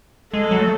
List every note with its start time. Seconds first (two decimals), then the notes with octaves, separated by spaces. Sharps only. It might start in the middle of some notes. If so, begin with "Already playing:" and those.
0.33 G#3 A4
0.51 F#3
0.60 A3